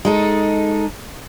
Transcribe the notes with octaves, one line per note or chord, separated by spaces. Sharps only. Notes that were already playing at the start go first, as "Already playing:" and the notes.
G#3 D#4 A4